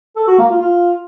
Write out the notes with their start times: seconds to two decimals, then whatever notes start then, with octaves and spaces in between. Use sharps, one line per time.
0.16 A4
0.27 F#4
0.39 A#3
0.50 F4
0.61 F4